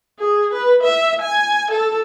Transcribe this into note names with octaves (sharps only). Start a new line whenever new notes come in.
G#4
B4
E5
G#5
A4